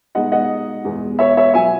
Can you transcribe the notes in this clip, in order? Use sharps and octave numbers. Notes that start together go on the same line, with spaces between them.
B2 G#3 D#4 D#5 F#5
D#5 F#5
E2 B2 G#3
C#5 E5
C#5 E5
B2 F#3 B3 E5 G#5